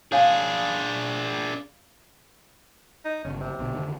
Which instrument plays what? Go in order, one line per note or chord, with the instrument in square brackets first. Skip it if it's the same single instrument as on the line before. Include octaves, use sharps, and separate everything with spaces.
[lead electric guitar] D4 G#4 [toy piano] C#5 F5 G#5
[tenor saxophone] D#4
[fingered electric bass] G1 C#3 [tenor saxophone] C#4
[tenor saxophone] C3
[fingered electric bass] A#1 B2 D3
F1 D3 D#3